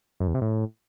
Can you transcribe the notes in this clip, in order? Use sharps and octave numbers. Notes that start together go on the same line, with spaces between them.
F#2
E2
C3
A2